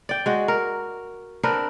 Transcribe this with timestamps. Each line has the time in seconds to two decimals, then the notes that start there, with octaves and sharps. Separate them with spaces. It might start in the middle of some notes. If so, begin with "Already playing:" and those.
0.09 D5 G5
0.26 G#3 F#4
0.48 A#4
1.43 C4 D4 A#4 B4